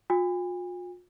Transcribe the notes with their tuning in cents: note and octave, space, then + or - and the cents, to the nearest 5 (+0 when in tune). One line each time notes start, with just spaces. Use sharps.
F4 +40 G#5 -40